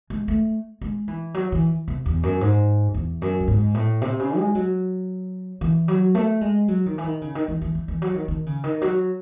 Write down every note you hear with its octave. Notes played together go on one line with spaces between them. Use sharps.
G#3
A3
G#3
E3
F#3
E3
C3
E2
F#2
G#2
E2
F#2
A2
G#2
A2
C3
C#3
G#3
F#3
E3
F#3
A3
G#3
F#3
D#3
E3
D#3
C#3
D#3
E3
E3
E3
E3
F#3
D#3
D#3
C#3
D#3
F#3